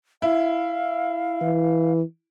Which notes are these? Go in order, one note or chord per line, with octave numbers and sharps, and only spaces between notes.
E4 F5
E3